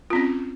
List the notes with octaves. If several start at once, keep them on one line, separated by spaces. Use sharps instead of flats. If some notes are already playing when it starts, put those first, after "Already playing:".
C4 C#4 F4